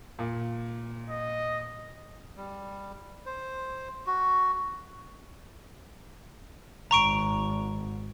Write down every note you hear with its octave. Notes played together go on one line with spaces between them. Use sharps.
A#2
D#5
G3
C5
F#4
G#1 A#5 C#6 D7